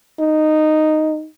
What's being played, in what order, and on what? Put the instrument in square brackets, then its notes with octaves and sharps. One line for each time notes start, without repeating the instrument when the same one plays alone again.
[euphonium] D#4